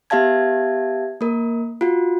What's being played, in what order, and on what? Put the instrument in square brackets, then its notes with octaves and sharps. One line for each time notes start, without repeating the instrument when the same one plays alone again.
[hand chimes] B3 G4 E5 F5 A5 G#6
A#3 A#4
F4 F#4